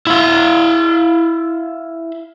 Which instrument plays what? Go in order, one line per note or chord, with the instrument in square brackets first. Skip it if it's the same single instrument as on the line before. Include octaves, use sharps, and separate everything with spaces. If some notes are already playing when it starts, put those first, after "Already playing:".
[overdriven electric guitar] E4 F5